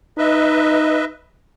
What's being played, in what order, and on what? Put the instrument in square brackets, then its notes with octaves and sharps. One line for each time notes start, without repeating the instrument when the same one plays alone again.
[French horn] D#4 [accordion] B4 D#5 E5